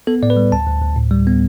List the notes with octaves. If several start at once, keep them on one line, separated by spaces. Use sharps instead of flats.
B3 A4
A2 D5
B4
G3
D2 A5
D2
D2
A2
G3
B3